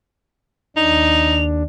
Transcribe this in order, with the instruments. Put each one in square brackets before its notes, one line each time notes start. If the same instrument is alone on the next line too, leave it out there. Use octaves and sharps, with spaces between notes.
[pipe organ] D#2 D4 [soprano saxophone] D#4 [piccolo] F7